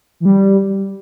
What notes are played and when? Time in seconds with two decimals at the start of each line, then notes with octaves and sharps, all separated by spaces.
0.20 E3
0.25 G3